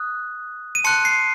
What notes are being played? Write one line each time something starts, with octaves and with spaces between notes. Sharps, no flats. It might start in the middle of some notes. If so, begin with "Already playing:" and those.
Already playing: D#6 F#6
D#7
A5 C6 F#6 C#7
C7